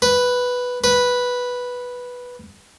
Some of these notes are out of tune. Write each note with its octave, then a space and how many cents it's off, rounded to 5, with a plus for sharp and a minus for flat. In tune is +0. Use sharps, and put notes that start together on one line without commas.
B4 +0
B4 -5